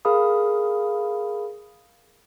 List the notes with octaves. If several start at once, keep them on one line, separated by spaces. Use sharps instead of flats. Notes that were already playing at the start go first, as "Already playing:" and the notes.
G#4 A#4 F5 B5 D#6